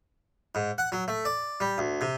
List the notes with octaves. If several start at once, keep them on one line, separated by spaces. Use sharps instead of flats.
G#2
F#5
F#3
A3
D5
G3
D2
C3